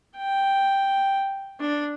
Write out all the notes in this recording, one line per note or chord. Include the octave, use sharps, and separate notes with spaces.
G5
D4